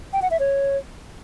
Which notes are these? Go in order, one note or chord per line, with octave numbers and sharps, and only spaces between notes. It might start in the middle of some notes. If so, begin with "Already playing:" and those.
G5
F#5
E5
C#5